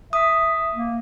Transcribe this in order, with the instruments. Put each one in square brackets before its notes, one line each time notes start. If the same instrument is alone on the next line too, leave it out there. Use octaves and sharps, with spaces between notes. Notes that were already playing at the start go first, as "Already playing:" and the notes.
[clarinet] E5 [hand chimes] D#6
[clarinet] A#3